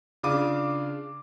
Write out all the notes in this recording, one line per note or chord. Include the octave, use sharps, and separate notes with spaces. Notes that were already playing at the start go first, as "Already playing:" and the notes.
C#3 D4 F4 D6 D#7